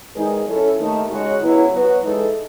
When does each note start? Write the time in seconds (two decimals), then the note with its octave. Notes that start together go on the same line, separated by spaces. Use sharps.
0.15 E2 D#3 G#3 D#4 G#4
0.46 F#3 C#4 E4 A4
0.77 D#2 D#3 A3 D#4
1.08 C#3 G#3 D#4 F#4 C#5
1.38 C#3 F#3 B3 E4
1.70 F#3 B3 F#4
2.01 E3 G#3 D#4 A4